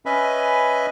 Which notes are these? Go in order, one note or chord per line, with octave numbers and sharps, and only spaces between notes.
C#4 B4 D#5 E5 G#5 B5